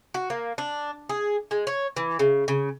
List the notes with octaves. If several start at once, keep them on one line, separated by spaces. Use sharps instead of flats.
F#4
A#3
D4
G#4
G#3
C#5
E3
C#3
C#3